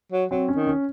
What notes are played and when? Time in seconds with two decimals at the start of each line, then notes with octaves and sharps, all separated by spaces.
0.12 F#3
0.31 F#3 C4
0.49 C#4
0.55 D#3
0.67 C#4